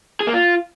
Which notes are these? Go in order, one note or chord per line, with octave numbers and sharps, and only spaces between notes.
G#4
A#3
F4